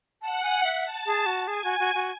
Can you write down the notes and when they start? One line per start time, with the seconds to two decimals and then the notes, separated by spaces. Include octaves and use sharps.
0.22 F#5 A5
0.43 G#5
0.64 E5
0.84 A5
1.06 G#4
1.26 F#4
1.48 G#4 G#5
1.64 F#4
1.79 F#4
1.95 F#4